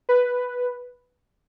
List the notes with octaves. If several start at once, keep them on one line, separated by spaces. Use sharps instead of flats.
B4